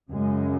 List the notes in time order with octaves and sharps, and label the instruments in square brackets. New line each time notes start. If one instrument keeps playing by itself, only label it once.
[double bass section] F#2 C#3 G#3